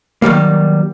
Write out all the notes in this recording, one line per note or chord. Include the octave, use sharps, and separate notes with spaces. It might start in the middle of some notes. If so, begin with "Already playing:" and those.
D#3 F#3 G3 A#3